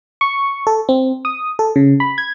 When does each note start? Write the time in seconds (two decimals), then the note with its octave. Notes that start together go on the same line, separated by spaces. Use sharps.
0.21 C#6
0.67 A4
0.89 C4
1.25 D#6
1.59 A4
1.76 C#3
2.00 B5
2.18 G#6